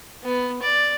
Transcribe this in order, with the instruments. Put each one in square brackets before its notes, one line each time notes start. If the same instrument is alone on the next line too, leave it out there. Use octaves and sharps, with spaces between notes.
[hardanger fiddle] B3
D5